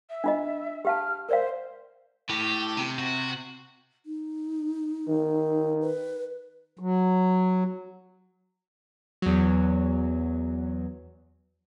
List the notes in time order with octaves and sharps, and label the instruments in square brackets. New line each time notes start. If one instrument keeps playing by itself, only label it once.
[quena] E5
[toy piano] D4 F4 D#5
[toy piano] G4 F5 A5 [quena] F6
[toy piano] A#4 D5 F5 [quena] C5
[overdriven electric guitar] A2 [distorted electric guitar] G4
[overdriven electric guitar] C3
[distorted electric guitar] F#4
[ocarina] D#4
[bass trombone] D#3
[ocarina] B4
[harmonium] F#3
[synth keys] E2 F#3